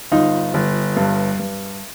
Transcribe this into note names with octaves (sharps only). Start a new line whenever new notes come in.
G1 D#4 F4
G1
G2
G2